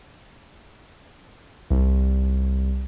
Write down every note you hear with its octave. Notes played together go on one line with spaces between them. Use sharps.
C2